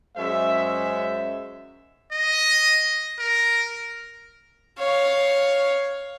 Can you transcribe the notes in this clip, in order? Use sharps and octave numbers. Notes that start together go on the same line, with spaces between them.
F#2 G#3 C5 E5
D#5
A#4
C#5 F5